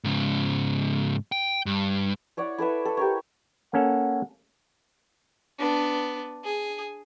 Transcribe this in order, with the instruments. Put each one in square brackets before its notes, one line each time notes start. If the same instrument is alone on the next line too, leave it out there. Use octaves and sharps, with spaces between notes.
[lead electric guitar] G#2 C#3
G5
G2
[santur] E4 C#5 D5 F#5
E4 A4 B4 E5
A4
G4 A#4 C#5
[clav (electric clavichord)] A#3 C#4 A4 [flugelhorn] F#5
[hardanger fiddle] B3 D4
G#4